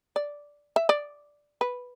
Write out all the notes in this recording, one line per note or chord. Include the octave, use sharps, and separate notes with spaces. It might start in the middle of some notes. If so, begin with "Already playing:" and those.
D5
E5
D5
B4